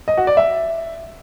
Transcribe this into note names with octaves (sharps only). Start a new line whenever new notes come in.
D#5
F#4
D5
E5